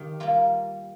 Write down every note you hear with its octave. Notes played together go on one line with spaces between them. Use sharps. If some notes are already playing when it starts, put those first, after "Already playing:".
Already playing: D#3 G4
G3 A#3 F4